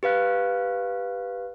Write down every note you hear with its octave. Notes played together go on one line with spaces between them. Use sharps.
G4 B4 F5 F#6